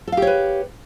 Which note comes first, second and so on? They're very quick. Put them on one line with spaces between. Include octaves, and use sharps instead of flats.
A4 F5 G4 C#5 B4